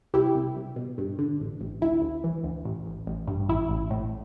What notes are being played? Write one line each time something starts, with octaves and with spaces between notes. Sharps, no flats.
C2 E4 G4
C2
C2
B2
G2
D3
A1
A1
D2 E4
D2
E3
D2
A1
A1
A1
G2
A1 E4
A1
A2